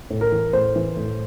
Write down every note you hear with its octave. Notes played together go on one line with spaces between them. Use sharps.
A2
A#4
E3
A2 C5
E3
A2